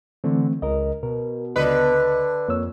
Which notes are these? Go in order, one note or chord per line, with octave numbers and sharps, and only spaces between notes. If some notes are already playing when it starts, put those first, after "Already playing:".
D3 E3 A3 C4
C#2 A#4 D#5
B2 A#4
C#2 D3 B4 D#5
F2 A#3 C#5 E6